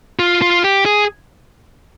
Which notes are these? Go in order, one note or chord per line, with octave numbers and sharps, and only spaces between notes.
F4
F4
G4
G#4